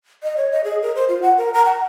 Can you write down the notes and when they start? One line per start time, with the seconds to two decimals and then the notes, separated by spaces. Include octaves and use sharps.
0.23 D#5
0.37 C#5
0.52 D#5
0.64 G#4
0.82 A#4
0.95 C5
1.09 F4
1.22 F#5
1.37 A#4
1.54 A#5
1.65 F#5